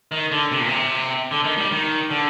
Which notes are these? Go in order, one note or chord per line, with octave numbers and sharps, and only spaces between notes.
D#3
D3
C3
A#2
C3
D3
D#3
G3
D#3
D3